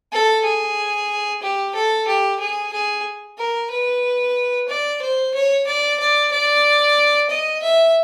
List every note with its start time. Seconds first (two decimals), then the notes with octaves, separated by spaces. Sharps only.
0.12 A4
0.44 G#4
1.42 G4
1.75 A4
2.07 G4
2.40 G#4
2.72 G#4
3.38 A#4
3.71 B4
4.68 D5
5.01 C5
5.34 C#5
5.67 D5
5.99 D5
6.31 D5
7.29 D#5
7.62 E5